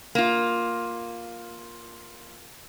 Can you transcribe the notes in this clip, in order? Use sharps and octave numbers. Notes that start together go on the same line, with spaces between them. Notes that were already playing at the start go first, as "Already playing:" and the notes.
A#3 F4